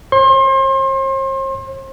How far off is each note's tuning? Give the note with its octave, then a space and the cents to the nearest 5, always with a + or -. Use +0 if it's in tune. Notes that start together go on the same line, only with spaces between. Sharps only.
C5 +45 C6 +35